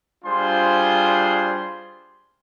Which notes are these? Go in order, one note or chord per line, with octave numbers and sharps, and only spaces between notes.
G3 D4 F4 G#4 C5 C6